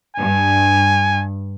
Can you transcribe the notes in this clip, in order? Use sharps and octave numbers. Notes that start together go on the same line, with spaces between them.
G2 G#5